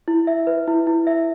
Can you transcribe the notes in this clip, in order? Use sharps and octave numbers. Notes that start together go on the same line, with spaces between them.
E4
E5
B4
E4
E4
E5